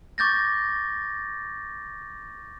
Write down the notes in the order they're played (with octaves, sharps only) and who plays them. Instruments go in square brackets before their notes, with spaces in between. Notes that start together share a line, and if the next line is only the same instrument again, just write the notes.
[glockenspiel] C#6 D6 G6 A6 A#6